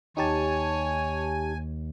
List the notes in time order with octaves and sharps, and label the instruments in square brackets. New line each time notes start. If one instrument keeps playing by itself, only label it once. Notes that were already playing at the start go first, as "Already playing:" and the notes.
[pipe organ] D#2 [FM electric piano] D#4 G4 A5 [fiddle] C#5 [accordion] G#5